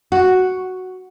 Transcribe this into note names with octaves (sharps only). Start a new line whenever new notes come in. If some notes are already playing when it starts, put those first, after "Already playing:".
F#4